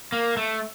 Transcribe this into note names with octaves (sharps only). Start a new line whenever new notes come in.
A#3
A3